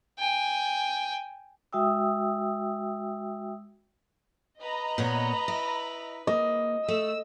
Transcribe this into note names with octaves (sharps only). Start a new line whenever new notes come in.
G5 G#5
G#3 F#4 E5 G5 D#6 E6
B4 D#5 A#5 B5
A#2 B3 C#5
E4
A#3 D#5
A3 E6